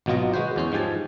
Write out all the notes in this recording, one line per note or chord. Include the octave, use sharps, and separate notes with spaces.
G#1 B2 F#3 F4 D#5
G#3 F#4 B4 C5
E2 C#4 C5
G#2 F3 G4 G#5 A5